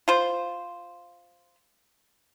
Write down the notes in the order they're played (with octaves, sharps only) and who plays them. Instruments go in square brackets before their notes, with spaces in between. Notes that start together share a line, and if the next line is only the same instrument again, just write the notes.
[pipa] F4 C5